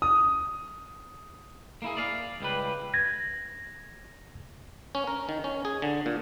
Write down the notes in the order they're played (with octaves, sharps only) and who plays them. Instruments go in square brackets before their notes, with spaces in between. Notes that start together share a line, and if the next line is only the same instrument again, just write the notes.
[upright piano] D#6
[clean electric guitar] A#3 E4 G#4
D5 F5
C#2 G3 B4
[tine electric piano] G#6 A#6
[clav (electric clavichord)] C#4
A#4
D#3
C#4
G#4
D3
A#2